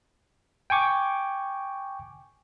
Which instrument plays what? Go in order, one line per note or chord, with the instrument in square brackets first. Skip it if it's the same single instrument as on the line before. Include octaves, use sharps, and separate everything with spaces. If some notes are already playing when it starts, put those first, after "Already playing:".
[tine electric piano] G5 G#5 C#6 D6